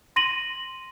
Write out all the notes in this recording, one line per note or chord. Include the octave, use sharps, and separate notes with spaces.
C6 A#6 D#7 F#7